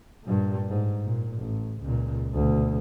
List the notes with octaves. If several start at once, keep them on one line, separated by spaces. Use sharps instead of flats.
G2 A#2
G#2
A#2
A1
C#2 A#2
D2 B2